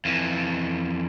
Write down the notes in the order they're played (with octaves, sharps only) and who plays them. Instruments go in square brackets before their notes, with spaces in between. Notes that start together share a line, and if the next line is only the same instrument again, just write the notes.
[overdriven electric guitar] F2 E3